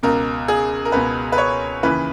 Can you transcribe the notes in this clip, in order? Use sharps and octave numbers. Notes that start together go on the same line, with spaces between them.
C#2 B2 A#4
G#4
A#4
C#2 B2 B4
B4
C#5
D#2 C#3 E3 B4